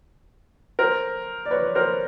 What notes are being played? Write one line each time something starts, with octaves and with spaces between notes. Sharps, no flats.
A#4 C5
D5
B4 C#5
A#4 C5